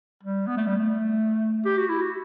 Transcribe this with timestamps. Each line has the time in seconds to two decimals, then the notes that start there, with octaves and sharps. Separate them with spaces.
0.23 G3
0.47 B3
0.57 A3
0.66 G3
0.77 A3
1.65 G4
1.77 F#4
1.89 E4
2.01 F#4